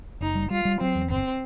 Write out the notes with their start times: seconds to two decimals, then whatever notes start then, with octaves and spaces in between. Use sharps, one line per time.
0.20 F#1 D#4
0.35 G3
0.50 G3 F4
0.65 G3
0.80 F#3 C4
0.95 E2
1.10 G1 C4